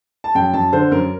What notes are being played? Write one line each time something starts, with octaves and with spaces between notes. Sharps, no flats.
A5
F#2 G5
F#2 A5
D3 C5
F#2 A#4